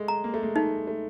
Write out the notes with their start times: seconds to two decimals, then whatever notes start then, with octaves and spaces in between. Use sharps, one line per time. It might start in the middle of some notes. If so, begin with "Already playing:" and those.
Already playing: G#3 A3
0.08 A#5
0.24 A#3
0.34 A3
0.43 G#3 A#3
0.56 A3 D#4
0.87 A3